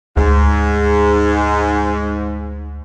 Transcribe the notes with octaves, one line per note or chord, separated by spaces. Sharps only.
D2 G#2